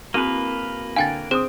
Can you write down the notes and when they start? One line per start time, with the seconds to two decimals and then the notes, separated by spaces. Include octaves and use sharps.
0.14 A#3 C4 E4 F#4 B4 D#7
0.96 D3 F5 G5 G#5 A6 D7
1.31 C4 G#4 C5 D#6 E7